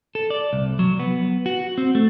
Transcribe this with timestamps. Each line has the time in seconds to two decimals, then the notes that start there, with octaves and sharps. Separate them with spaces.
0.15 A4
0.30 D5
0.53 C2
0.79 F#3
0.99 B3
1.46 F#4
1.78 C4
1.95 A3